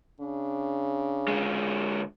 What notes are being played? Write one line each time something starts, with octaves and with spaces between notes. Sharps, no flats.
C#3 D4
D3 G#3